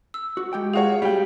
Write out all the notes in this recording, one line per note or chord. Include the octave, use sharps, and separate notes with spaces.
E6
F#4
G#3 G4 G5
F4 F#4 G#4 C#5
G3 F5 G5